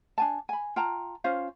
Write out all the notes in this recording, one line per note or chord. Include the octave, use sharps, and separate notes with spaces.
D4 G#5 A5
G#5 B5
F4 G5 A5 A#5
C#4 F4 C5 F5